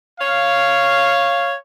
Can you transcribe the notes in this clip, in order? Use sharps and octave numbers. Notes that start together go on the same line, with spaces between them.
C#5 F5